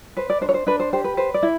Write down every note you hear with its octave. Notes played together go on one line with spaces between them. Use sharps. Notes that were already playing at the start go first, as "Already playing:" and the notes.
B4 C5
D5
D4 C5
C#5
C5
D4 B4
C5
G4 C5
B4
B4 C5
D5
E4